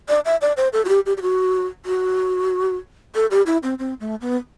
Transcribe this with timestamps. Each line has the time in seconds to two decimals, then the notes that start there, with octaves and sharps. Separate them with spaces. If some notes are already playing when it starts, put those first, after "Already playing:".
0.09 D5
0.25 E5
0.41 D5
0.57 C5
0.73 A4
0.85 F#4
0.89 G4
1.06 G4
1.17 G4
1.22 F#4
1.86 F#4
3.15 A4
3.31 G4
3.46 E4
3.63 C4
3.79 C4
4.00 A3
4.21 B3